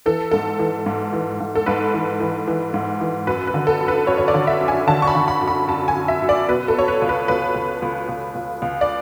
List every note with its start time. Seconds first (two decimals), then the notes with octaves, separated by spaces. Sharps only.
0.06 E3 A4
0.31 G#2 A4
0.59 E3
0.86 G#2
1.13 E3
1.40 G#2
1.55 A4
1.66 G#2 B4
1.94 E3
2.20 E3
2.48 E3
2.74 G#2
3.01 E3
3.27 F#2 B4
3.47 B4
3.54 D3
3.67 A4
3.80 F#2
3.88 B4
4.07 F#2 C#5
4.18 C#5
4.28 D5
4.34 D3
4.47 E5
4.61 F#2
4.68 G#5
4.87 D3 A5
5.02 C#6
5.07 B5
5.15 D3
5.28 B5
5.41 F#2
5.48 B5
5.68 F#2 A5
5.88 G#5
5.95 F#2
6.08 E5
6.22 F#2
6.29 D5
6.48 B2 B4
6.68 A4
6.75 B2 C#5
6.88 B4
7.02 C#2
7.09 B4
7.28 C#2 B4
7.55 C#2
7.82 C#2
8.09 C#2
8.35 C#2
8.62 C#2
8.81 D5